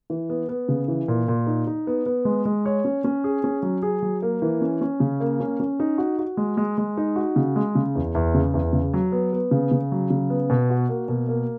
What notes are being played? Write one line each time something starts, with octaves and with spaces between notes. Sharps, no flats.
E3
B3
B3
C#3
E3
A#2
A#2
D#4
D#4
B3
B3
G#3
G#3
C#5
C#4
C#4
G#4
C#4
F#3
G#4
F#3
A#3
E3
C#4
C#4
C#3
A#3
C#4
C#4
D#4
F#4
F#4
G#3
G#3
G#3
D#4
F#4
C#3
G#3
C#3
E2
E2
C#3
E2
C#3
F#3
B3
B3
C#3
C#3
F#3
C#3
B3
B2
F#4
A#3
B2
A#3